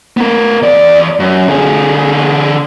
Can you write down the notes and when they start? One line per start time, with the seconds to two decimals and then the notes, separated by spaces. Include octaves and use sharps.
0.17 B3 A#4
0.62 E2 D5
1.20 F#2
1.48 D3 G#4